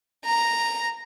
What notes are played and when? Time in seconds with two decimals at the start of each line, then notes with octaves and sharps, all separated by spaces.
0.25 A#5